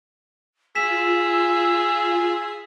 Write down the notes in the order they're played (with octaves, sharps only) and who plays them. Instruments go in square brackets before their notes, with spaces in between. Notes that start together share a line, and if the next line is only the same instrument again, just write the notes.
[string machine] F4 [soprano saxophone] G#4 [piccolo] E6 [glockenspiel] B6 E7